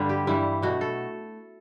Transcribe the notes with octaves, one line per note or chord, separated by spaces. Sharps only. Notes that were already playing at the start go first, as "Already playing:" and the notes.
Already playing: G2 D3 G3 B4
G4
G2 E3 G3 E4
B2 A3 F#4
A4